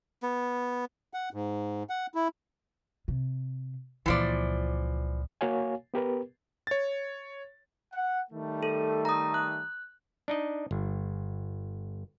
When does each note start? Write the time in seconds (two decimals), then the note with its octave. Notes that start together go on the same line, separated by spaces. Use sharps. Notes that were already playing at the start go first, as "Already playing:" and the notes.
0.22 B3
1.14 F#5
1.33 G#2
1.89 F#5
2.15 E4
3.08 C3
4.06 C#2 A#2 E3 F3 D5
5.41 A#3 F#4 C#5 F5 G#5
5.94 B3 G4 A#4 B4
6.67 C#5 A6
7.93 F#5
8.31 D#3 G3 A3
8.63 A4
9.05 A#5 D#6
9.34 F#6
10.28 D4 D#4 D#5
10.71 G1